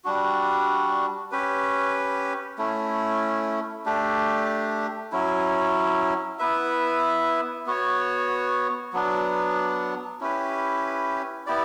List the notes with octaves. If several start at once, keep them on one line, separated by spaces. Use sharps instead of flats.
G3 D4 F#4
C#4 G4 B4
A3 C#4 E4
A3 D4 G4
F#3 C#4 E4
B3 E4 B4 E5
B3 F#4 C#5
F#3 B3 D4
C#4 E4 G4 B4
B3 E4 G4 D5